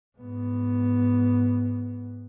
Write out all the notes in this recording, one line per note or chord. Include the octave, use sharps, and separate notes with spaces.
G#2 B3